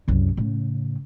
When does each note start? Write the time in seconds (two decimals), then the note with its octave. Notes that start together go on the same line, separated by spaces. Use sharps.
0.08 C2 F#2
0.37 A2 C#3